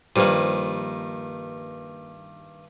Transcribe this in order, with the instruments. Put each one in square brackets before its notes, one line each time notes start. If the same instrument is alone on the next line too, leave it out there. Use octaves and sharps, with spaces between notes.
[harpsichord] G2 D#3 [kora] F3 G3 A#3